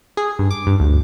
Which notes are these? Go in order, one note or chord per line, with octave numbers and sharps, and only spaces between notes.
G#4
G2
D6
G2
D2